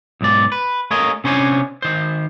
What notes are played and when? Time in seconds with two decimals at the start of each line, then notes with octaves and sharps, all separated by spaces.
0.21 B1 G#2 D5
0.52 B4
0.91 A3 A#3 G#4 A#4 C#5 D#5
1.24 C3 C#4 D4 C5 C#5 G#5
1.82 D#3 C5